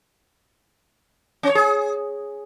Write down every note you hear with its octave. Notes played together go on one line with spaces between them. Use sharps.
C#4
C#5
G#4